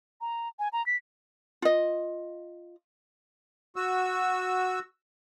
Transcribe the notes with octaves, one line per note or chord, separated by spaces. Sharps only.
A#5
G#5
A#5
B6
F4 D#5
F#4 E6